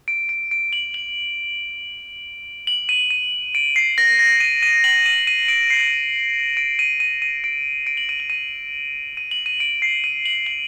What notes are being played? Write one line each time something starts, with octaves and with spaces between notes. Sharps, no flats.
D7
D7
D7
F#7
F#7
F#7
D#7
D#7
D7
C7
A#6
A#6
D#7
D#7
F#7
D#7
D#7
D7
C7
D7
D#7
D#7
D#7
D7
D7
F#7
D#7
F#7
D#7
D#7
F#7
D#7
D7
C7
D#7
F#7
F#7